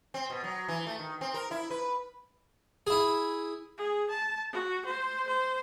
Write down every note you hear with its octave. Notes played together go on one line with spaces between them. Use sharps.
C4
B2
F#3
E3
A3
D#3
C4
A#4
E4
B4
E4 G#4
G#4
A5
F#4
C5
C5